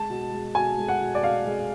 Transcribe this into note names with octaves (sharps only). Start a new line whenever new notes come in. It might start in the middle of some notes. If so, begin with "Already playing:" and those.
Already playing: G#3 A5
B2
G#3
B2 G#5
G#3
F#5
B2
D5
B2 F5
G#3